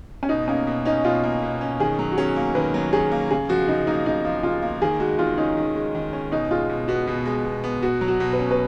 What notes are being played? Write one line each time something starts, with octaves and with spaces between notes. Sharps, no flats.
C#4
B2 D#4
A#3 C#4
B2
C#4 D#4
B2 F4
A#3
B2
C#4
D#3 G#4
F#3
F#4
C#4 G#4
A#3
D#3 B4
F#3
C#4 G#4
A#3
C#3 G#4
F3 F#4
C#3 D#4
A#3 D#4
C#3 D#4
F3
C#3 F4
A#3
D#3 G#4
G#3 F#4
D#3 F4
C#4 D#4
D#3
G#3
D#3
C#4
B2 D#4
G#3 F4
B2
B3 F#4
B2
G#3
B2
B3
B2 F#4
F#3
F#4
B2
B4
C#4
B4